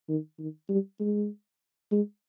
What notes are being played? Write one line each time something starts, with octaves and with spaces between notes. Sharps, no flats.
D#3
D#3
G3
G#3
G#3